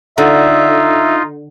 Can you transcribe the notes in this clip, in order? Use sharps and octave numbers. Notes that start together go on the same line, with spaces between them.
D3 D#4 F4 E5